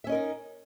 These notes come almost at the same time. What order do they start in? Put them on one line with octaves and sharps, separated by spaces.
E5 C#4 D#5 A#4 D#4